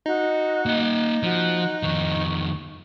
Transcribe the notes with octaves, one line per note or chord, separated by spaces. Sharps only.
D#4 F#4 D#5
A#3 F#5
F3 F#4
F2 D#3 C#6